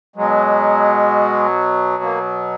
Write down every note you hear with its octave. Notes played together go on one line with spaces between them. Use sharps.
B2 F#3 G#3
A#3